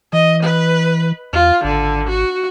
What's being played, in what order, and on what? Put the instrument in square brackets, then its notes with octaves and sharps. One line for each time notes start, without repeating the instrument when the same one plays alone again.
[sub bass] E3 [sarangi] D#5
[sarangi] B4
[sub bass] E2 [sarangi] F4
[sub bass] G#1 [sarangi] D3
[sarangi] F#4